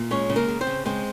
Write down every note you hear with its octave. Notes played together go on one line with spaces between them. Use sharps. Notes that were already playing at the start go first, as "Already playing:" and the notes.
Already playing: A#2
G#3 C#4 C#5
C#3
A#3 A#4
C#3
C4 C5
C#3
G#3 C4 C5